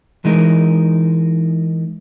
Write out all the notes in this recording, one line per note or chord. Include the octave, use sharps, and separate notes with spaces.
E3 G#3 D#4 A#4